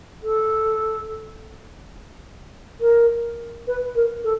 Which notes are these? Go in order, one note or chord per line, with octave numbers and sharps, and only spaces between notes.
A4
A#4
B4
A#4
A4